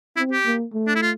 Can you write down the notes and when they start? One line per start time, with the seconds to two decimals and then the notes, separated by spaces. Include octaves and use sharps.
0.16 C4 E4
0.32 G4
0.45 A#3
0.73 A3
0.87 D4
0.95 E4
1.02 F4